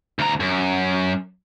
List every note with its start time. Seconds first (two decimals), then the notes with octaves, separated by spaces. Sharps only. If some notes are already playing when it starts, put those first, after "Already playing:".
0.19 D2 A#5
0.40 F#2